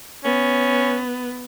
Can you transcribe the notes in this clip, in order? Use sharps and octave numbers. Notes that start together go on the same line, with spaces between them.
B3 C#4